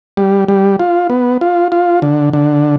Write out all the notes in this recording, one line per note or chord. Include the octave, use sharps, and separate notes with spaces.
G3
G3
F4
B3
F4
F4
D3
D3